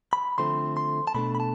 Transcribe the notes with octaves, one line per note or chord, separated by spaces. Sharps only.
B5
D3 F3 A3 C4 C6
C6
A5
B2 A3 D4 B5
B5
A5